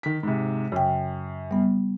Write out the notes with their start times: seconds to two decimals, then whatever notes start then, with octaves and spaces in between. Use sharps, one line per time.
0.03 D#3 B6
0.23 G#2 C3
0.72 F#2 C#3 G5
1.51 G3 B3